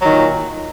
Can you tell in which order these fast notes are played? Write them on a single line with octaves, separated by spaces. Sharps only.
F#3 D#3 A#2